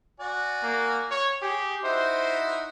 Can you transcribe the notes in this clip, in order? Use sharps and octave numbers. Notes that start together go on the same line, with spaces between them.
F#4 D5 G#5
A#3
C#5
G4 G#4
D#4 E4 F#4 C5